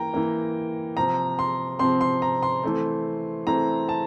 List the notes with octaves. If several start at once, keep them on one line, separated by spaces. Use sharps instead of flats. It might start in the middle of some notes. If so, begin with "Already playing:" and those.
Already playing: E3 A#3 G5 A#5
E3 A#3
C3 F3 C4 A#5
C6
C3 F3 C4 C6
C6
A#5
C6
E3 A3 C4
E3 A3 C4 A#5
A5